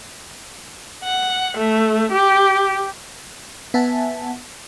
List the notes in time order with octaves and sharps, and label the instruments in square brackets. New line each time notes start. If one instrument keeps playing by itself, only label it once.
[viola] F#5
A3
G4
[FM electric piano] B3 E5 F#5 G#5 A5